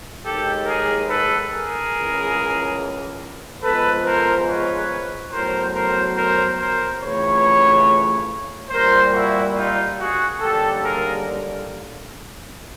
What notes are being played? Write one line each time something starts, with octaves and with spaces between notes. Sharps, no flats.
D#2 D#3 G#3 G4 A4
G#4 A#4
A4 B4
G#4 A#4
C#2 C#3 E3
G#2 F3 G#3 B3 A4 B4
A#4 C5
B4 C#5
A2 F#3 B3 A#4 C5
A#4 C5
A#4 C5
A#4 C5
F2 C#3 E3 A3 B4 C#5
A#2 G3 A#3 A#4 C5
E4 F#4
D#4 F4
F#4 G#4
D#2 D3 G3 A#3 G4 A4
G#4 A#4